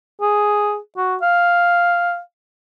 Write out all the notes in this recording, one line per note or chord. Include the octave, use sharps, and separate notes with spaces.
G#4
F#4
F5